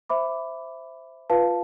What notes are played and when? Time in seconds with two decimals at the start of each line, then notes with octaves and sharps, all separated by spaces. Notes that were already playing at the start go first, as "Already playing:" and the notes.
0.10 C5 E5 B5 D6
1.30 F4 B4 F5 A5